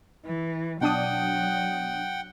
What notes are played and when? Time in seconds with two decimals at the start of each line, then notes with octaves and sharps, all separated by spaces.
0.24 E3
0.81 B2 F#3 D4 F#5 G5 D#6